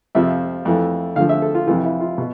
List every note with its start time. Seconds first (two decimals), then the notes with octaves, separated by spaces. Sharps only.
0.15 F2 C3 F3 E5
0.65 F2 E3 A3
1.16 D2 D3 F3 F5
1.29 E5
1.42 A4
1.55 F4
1.67 F2 C3 E3 F4
1.85 E4
2.01 F4
2.18 B2